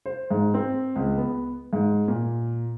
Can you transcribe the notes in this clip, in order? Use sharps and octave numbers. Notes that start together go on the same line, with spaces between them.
C5
G#2
C4
C#2
B3
G#2
A#2